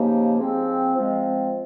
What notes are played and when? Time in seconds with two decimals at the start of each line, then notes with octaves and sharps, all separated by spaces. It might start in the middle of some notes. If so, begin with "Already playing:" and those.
Already playing: C#3 F3 A#3 D#4 G4
0.39 F3 G#3 C4
0.96 F3 G#3 C4